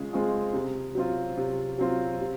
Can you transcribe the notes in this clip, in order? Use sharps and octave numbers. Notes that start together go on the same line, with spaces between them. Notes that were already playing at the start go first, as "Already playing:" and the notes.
Already playing: C#3 G#3 F4
G#3 C4 F4 G#4
C3
F#3 C4 F4
C3
F#3 C4 F4
C3